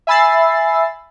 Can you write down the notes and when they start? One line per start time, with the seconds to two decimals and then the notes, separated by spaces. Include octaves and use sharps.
0.07 E5 G#5 B5 E6 A6 C7